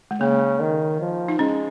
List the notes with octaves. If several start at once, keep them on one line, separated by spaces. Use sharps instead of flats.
G#3
C#3 A#3
D#3
F3
D#4
G#3 C#4